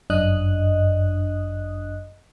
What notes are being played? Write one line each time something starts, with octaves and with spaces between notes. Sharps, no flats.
G1 F#2 D4 D#5 D#6 F#6